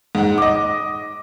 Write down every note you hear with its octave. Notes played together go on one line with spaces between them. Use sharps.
G#2 F#5
D#5 D6